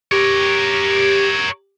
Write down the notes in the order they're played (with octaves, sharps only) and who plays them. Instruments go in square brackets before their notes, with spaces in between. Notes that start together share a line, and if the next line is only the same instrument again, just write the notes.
[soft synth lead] G4 [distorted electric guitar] A#4 C#5